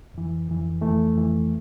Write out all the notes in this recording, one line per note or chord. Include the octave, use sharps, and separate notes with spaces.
F2 E3
F2 E3
F2 E3 A3
F2 E3